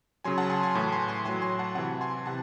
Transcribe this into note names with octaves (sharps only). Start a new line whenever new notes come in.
C#3 F#3 G#5 C6
F#5 A5
G#5 C6
G#5 C6
A2 E3
G#5 C6
G#5 C6
A2 F#3 G#5 C6
G#5 C6
F#5 A5
C3 E3 F#5 A5
G#5 C6
C3 F#5 A5